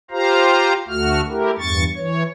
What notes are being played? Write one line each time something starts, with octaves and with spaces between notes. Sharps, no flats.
F4 G4 C5 F5 A#5
D2 A3 F#4 F6
A3 E4 G4 A#4
E2 G2 C#6 A6
E3 C#5